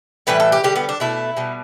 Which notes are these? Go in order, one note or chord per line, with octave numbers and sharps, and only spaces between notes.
A2 E3 G3 B4
A4
G4
D3 G3 G4
B3
D4
B2 A3 E4
B2 G3